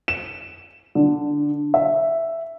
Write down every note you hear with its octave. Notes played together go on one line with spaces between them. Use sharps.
E7
D3
E5